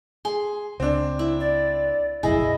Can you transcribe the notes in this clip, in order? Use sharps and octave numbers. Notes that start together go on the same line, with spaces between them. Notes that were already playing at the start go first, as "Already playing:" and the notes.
G#4 C6
C#2 C4 D4
E4
D5
F#1 B1 F2 E4 G#4 D#5